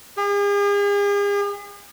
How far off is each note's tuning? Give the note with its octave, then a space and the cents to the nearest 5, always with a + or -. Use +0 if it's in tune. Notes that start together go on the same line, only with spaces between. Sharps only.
G#4 -45